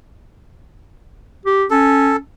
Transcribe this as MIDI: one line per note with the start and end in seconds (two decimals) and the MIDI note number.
1.46 1.65 67
1.70 2.18 61
1.70 2.16 69